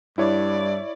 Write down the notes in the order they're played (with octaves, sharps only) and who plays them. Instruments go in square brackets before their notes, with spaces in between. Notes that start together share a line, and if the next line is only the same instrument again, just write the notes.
[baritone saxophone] G2 [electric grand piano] E4 C#5 [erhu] D5